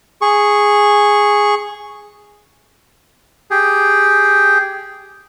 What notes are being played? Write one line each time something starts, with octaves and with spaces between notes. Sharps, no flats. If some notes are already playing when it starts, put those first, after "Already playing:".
G#4 C#6
G4 G#4